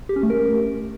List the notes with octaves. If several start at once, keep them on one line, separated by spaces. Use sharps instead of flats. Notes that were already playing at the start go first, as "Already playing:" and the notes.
G4
C#4
A3
A#4